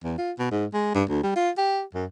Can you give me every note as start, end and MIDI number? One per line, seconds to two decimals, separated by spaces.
0.04 0.16 40
0.18 0.32 65
0.39 0.51 47
0.51 0.65 44
0.74 0.90 56
0.95 1.04 43
1.09 1.22 38
1.23 1.34 55
1.36 1.50 65
1.58 1.83 67
1.94 2.06 42